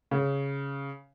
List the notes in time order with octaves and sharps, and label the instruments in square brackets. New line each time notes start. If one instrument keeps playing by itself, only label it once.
[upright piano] C#3